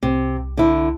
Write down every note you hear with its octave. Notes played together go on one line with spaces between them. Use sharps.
C2 C3
D3 E4